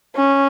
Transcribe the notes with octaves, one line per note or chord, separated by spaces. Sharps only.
C#4